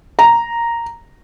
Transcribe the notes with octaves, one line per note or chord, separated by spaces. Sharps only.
A#5